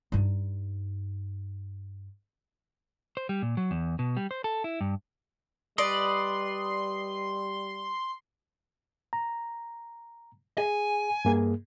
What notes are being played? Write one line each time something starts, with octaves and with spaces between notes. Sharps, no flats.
G2 D#4
C5
G3
A#2
F#3
E2
B2
G3
C5
A4
E4
G2
G3 B4 D5 D#5 C6
A#5
G#4 G#5
G2 A#3 G#4